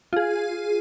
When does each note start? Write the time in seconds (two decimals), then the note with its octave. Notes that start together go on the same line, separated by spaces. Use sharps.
0.13 F4 G#4